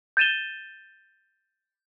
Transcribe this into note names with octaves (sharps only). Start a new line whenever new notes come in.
G6 A6 D#7 E7 G7